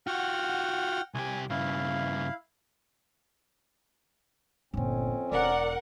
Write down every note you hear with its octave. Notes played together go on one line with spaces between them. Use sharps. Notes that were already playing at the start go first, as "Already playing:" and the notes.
F4 F#4 F#5 G5 F6
C2 G4 G#5
G2 C#3 E4 F5
G1 F2 A#2 C4 C#4
E1 A#4 D5 F#5